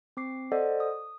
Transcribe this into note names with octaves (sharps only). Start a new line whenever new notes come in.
C4 D6 C7
A4 C5 D5 D#5 F#5
D#6